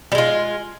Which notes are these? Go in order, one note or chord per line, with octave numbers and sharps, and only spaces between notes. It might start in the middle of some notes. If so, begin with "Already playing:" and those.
G3 G#3 F4